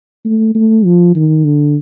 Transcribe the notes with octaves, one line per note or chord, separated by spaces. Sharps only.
A3
A3
F3
D#3
D3